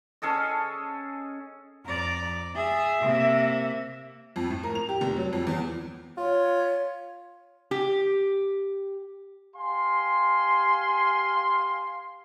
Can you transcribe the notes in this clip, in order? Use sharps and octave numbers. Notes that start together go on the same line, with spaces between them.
C#4 G#4 A4 D#5
F2 D5 A#5
G#4 E5
C3 A#3
F2
A2
A#4
F7
G4
F1
F#3
F2
E2
F4 C#5
G4
G4 F5 G#5 C6